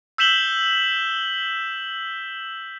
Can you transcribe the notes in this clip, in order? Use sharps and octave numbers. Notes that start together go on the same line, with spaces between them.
E6 G6 B6 E7 F#7 G7